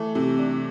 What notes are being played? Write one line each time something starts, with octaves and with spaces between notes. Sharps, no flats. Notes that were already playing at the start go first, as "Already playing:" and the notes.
Already playing: E3 A3
C3
D4